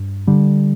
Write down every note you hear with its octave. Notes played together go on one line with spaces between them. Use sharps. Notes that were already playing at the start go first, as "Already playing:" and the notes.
Already playing: G2
D3 G3